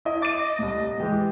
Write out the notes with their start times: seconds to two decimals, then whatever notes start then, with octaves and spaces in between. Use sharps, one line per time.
0.05 E4 D#5
0.22 D6 A6 D#7
0.39 D#5
0.59 C2 A2
1.00 E3 G#3 G4